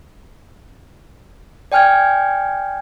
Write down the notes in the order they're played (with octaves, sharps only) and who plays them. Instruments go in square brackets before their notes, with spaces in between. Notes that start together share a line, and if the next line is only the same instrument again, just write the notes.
[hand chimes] D5 G5 G#5 F6 G6 G#6